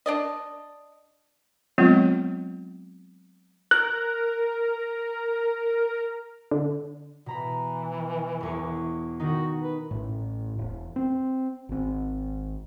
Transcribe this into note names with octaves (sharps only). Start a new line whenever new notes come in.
D4 D5 D#5
F#3 G#3 B3 C4 F4
A#4 F#6
D3
B2 E3 A#5 B5
E1 E2 C#6
D#3 D#4 F#4
B4
A1 A2
E1
C4
G#1 C4